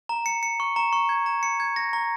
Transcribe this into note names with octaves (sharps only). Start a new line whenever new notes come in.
A#5
C#7
C#7
C#6
A#5
C#6
G#6
A#5
C#7
G#6
A#6
A#5